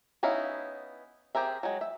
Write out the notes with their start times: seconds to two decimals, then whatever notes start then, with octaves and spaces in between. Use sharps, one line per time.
0.23 B3 C#4 D#4 E4 F5
1.35 C4 G4 G#4 A#4 E5
1.63 F#3 G#3
1.81 E5